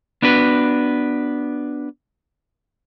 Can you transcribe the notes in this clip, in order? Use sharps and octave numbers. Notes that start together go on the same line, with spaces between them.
B3 D4 F#4 B4